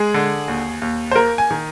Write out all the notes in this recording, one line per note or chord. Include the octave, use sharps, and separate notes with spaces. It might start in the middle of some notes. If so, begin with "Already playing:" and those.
Already playing: G#3 G#4
D3
D#2
D#2
C5
A#3 A#4
G#5
D#3